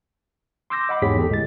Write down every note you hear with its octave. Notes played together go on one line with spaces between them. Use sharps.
C6 D6 E6 G6 A#6
D#5 F#5 B5 D6
E2 G#2 G4 G#4 C#5 B6
E2 G4 A4
G1 A2 G#3 G#4 A6